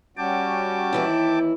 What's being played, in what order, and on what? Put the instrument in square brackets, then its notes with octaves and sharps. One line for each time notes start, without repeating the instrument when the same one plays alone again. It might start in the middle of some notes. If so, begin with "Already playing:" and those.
[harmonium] G3 C#4 F#4 [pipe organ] G5 A5 D6
[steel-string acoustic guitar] D#2 E3 E4